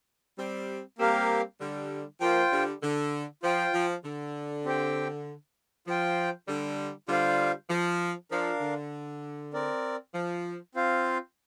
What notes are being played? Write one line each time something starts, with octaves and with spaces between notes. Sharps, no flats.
G3 C4
G3 A#3 C4 G4 A#4 F5
D3 G3
F3 A#3 F4 C5 G5
D3 G3
D3
F3 F4 C5 G5
F3
D3
C4 G4 C5 G5
F3 F4 C5 G5
D3 G3
D3 G3 F4 C5 F5
F3
F3 D4 A#4 F5
D3
C4 A#4 D5
F3
C4 F4 C5 F5